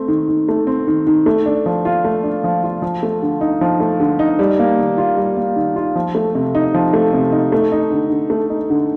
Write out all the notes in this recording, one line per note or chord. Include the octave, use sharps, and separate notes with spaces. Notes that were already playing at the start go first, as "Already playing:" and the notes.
Already playing: A3 C4
D#3
D#3
A3
C4
D#3
D#3
A3
D4
F3
F4
A3
D4
F3
F4
F3
A3
D3
D#4
F3
A3
D3
D#4
G3
A#3
D#3
F4
G3
A#3
D#3
F4
F3
A3
C3
D#4
F3
A3
C3
D#4
A3
D#4
D3
D3
A3
D#4
D3